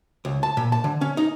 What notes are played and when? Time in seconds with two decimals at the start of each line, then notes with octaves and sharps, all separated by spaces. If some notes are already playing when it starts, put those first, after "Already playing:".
0.25 C#2
0.43 A5
0.57 A#2
0.72 A5
0.84 D3
1.01 C#4
1.17 D#4